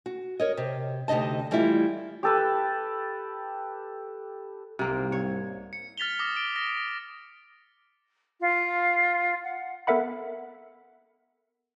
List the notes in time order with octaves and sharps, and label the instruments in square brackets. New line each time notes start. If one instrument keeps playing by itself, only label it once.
[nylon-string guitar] F#4
A#4 C#5 D#5
C3
D2 C3 D#4 D#5 A5
E3 G3 A3 D4 E4 F4
[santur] G4 A4 B4
[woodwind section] C2 G#2 [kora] C3 A#3 C4
[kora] C#5
[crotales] C#7
F6 A6 B6 F7 G7
D6 D#6 A#6
D7
A#6
[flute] F4
F#5
[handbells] B3 A4 A#4 E5 F#5 B5